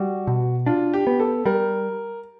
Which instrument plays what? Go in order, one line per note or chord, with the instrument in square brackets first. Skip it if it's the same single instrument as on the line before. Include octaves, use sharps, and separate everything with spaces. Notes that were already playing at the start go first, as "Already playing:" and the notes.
Already playing: [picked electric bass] G3 [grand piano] F#4
[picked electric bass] B2
[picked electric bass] D4 [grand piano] F4
[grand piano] G4
[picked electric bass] B3
[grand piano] A4
[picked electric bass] G3 [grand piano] A#4